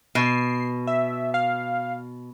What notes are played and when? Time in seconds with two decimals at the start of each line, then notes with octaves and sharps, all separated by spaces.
0.15 B2 C7
0.87 E5
1.34 F5